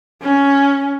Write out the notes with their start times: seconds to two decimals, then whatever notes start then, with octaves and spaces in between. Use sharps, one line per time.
0.22 C#4